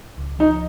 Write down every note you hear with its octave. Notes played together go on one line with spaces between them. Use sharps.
C#2
F3 D#4